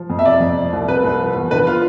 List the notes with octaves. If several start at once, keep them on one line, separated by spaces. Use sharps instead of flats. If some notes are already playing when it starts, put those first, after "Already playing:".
Already playing: F3
F2
E5
C3 D5
F2
F3
C2
C3 B4
C2
F3
E2
D3 B4
F4